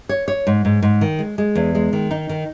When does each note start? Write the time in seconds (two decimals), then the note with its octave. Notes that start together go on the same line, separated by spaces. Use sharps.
0.09 C#5
0.28 C#5
0.47 G#2
0.65 G#2
0.83 G#2
1.01 D#3
1.19 G#3
1.38 G#3
1.55 E2
1.75 G#3
1.93 D#3
2.11 D#4
2.29 D#3